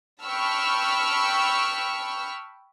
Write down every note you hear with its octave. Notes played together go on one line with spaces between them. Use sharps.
G5 A5 B5 C#6 E6 F6